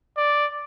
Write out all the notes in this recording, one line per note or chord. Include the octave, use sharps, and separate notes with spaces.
D5